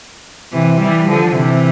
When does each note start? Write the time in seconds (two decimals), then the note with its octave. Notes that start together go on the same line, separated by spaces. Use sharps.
0.52 C3 E3
0.81 E3 G3
1.09 D3 F3
1.36 C3 E3